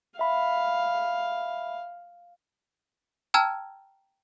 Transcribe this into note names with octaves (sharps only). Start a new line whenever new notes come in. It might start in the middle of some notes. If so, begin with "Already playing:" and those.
E5 F5 B5
G5 A5 A#5 E6 F6 G#6